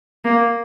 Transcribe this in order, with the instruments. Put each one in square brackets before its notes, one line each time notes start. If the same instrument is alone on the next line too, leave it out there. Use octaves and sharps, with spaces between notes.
[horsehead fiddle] A#3